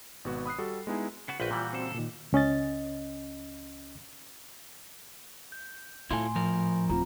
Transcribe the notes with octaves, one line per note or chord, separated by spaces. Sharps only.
G#1 B2 B3 F#4
B5 D#6 F#6 C7
G3 F#4 A4
G#3 B3 D#4 E4 G#5
C#3 B3 F#4
A#1 F4 F#4 B4 G5 B5
A#2 E3 G3
C#3 C4 F#4 A4
A#2 D#3
C#2 C#4 D#5 A6
G6
A2 E4 F4 A4 G#5 C6
F3 A#4
D1 F3 C4 F4 A#5